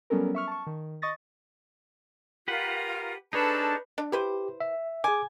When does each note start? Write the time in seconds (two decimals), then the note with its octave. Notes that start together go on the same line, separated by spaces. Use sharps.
0.10 F#3 G3 B3 C#4 A4 A#4
0.35 E5 C#6 F6
0.48 A5 C#6
0.67 D#3
1.02 D#5 C#6 D#6 A6 A#6
2.48 F4 G4 A#4 B4 F#5
3.33 D4 D#4 G#4 A4 B4 C#5 A5
3.98 D4
4.12 E4 G4 B4 C5
4.60 E5
5.04 G#4 G#5 D6